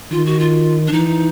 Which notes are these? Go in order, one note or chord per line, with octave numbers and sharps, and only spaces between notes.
D#3 F4
F#4
F4
D4
E3 D#4